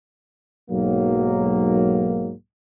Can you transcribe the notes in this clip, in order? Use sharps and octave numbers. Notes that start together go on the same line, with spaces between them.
B1 G#2 F#3 A#3